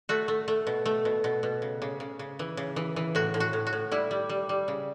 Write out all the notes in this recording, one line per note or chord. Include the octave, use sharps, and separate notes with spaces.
A3 F#4
A3
A3
B2
A3
B2
B2
B2
C#3
C#3
C#3
C#3
E3
C#3
E3
E3
A2 F#4
A2
F#4
A2
F#4
A2
G3 E4
G3
G3
G3
C#3